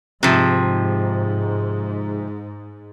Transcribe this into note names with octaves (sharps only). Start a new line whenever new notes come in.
G#2 C3 F3